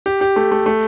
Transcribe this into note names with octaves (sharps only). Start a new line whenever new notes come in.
G4
G4
A3
A3
A3